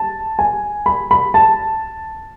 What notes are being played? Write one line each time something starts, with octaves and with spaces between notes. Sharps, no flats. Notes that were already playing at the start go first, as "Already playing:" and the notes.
Already playing: A5
G#5
B5
B5
A5